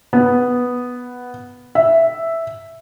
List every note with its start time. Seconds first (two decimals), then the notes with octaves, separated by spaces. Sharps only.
0.13 B3
1.75 E5